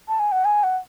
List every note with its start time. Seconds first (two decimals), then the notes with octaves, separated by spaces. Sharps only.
0.08 A5
0.19 G#5
0.32 F#5
0.45 G#5
0.63 F#5